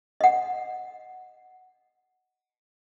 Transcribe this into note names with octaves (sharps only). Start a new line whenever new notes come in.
D#5 F#5